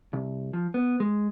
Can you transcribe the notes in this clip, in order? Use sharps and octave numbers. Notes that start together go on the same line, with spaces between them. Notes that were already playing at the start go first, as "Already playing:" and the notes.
C2
F3
B3
G#3